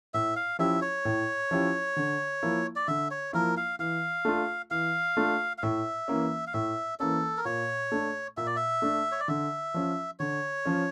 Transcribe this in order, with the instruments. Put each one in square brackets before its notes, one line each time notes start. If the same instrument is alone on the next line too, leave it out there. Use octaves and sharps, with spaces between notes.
[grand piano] A2 [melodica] E5
[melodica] F5
[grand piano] F3 C#4 E4 G4 [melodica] E5
[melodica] C#5
[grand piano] A2
F3 C#4 E4 G4
D3
F3 A#3 E4
[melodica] D5
[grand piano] D3 [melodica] E5
[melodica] C#5
[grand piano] F3 A#3 E4 [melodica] A#4
[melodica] F5
[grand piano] E3 [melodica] F5
[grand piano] A3 D4 F4
[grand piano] E3 [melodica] F5
[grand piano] A3 D4 F4
[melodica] F5
[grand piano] A2 [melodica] E5
[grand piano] E3 A#3 C#4
[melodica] F5
[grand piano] A2 [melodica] E5
[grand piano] E3 A#3 C#4 [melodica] A4
[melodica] A#4
[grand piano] A#2 [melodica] C#5
[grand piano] A3 D4
[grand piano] A#2 [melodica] E5
[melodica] D5
E5
[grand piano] A3 D4
[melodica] C#5
D5
[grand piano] D3 [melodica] E5
[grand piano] F3 C#4
[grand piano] D3 [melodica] C#5
[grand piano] F3 C#4